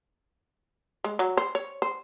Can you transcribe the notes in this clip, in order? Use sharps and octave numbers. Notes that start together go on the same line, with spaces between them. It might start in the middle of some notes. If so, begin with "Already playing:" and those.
G#3
F#3
C5
C#5
C5